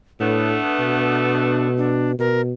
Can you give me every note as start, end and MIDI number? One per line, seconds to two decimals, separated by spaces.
0.20 0.57 45
0.20 1.91 57
0.20 1.91 59
0.20 1.68 62
0.80 2.18 47
1.78 2.12 62
2.19 2.52 47
2.19 2.41 70